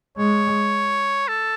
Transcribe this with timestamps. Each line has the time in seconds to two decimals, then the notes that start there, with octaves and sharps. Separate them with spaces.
0.17 G#3 C#5
1.28 A4